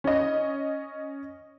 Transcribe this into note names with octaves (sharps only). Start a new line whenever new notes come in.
C#4 D#5